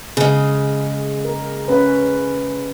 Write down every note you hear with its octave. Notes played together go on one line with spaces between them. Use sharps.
C#3 G#3 G#4
A#4
C#4 B4